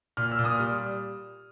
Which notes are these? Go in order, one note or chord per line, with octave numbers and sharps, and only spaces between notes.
A#2 F6
E6
A#2
D#6 F6
G3